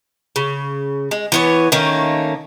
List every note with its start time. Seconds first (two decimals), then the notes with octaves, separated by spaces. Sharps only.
0.36 C#3
1.11 G#3
1.32 E3 B3 C#5
1.72 D#3 A3 A#3 C#4